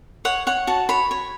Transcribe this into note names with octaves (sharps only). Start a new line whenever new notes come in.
C#5 F#5
C#5 F#5
F#4 A5
C#5 B5
C#5